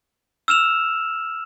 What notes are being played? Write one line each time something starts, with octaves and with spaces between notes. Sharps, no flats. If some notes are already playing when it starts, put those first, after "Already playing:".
E6 F6 E7 F7